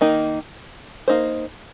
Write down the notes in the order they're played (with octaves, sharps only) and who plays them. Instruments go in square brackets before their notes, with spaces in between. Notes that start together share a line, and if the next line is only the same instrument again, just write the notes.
[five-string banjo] D#3 A#3 D#4
A#3 D#4 C5